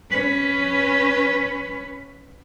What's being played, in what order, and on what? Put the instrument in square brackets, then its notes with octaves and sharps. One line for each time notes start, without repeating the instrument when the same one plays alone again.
[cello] C#4 B4